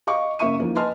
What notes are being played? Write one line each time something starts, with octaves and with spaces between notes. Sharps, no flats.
D#5 F5 C#6 D6
F#1 A#3 E5 C#6 D#7
D#2 E3 F3 A#3
B4 D#5 G#5 A5 C6 F6